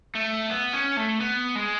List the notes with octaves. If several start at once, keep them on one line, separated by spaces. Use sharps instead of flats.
A3
B3
C#4
A3
B3
G#3